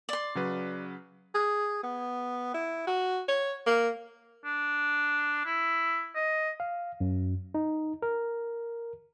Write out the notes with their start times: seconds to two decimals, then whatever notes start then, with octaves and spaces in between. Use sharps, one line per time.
0.09 D5 C6
0.35 C#3 F#3 B4
1.35 G#4
1.83 B3
2.54 E4
2.87 F#4
3.28 C#5
3.66 A#3
4.45 D4
5.45 E4
6.16 D#5
6.60 F5
7.00 F#2
7.54 D#4
8.02 A#4